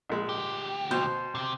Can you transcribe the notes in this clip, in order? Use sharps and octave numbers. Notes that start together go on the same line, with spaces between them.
A#1 G#3
D2 G4
B2 C5
C3 G4